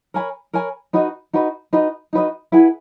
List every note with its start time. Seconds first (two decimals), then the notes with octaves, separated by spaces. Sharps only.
0.14 A#4 C#5 G#5 B5
0.53 A#4 C#5 G#5 B5
0.93 D#4 F#4 B4 D#5
1.33 D#4 F#4 B4 D#5
1.73 D#4 F#4 B4 D#5
2.13 D#4 F#4 B4 D#5
2.52 E4 G#4 B4 F#5